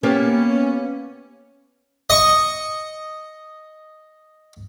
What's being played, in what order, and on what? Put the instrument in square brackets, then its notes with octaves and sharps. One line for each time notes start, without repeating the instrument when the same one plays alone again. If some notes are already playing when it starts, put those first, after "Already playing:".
[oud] A#3 B3 G4 [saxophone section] C#4
[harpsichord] D#5 C#6